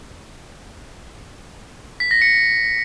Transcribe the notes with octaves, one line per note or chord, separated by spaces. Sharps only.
B6
A#6
C#7